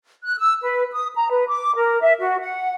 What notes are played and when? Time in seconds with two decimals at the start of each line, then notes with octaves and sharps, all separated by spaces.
0.24 F#6
0.38 E6
0.62 B4
0.92 D#6
1.15 A#5
1.30 B4
1.48 D6
1.76 A#4
2.01 E5
2.20 F#4
2.40 F#5